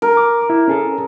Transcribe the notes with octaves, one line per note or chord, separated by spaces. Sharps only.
A#4
D6
E4
C#4 G#4 A4